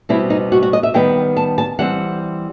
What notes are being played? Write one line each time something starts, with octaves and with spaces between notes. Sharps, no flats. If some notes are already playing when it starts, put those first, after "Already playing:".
B2 G3 C4 E4
D#4
F#4
F#4
D#5
E5
D#3 G3 B3 G5
A5
A5
E3 G3 C4 F#5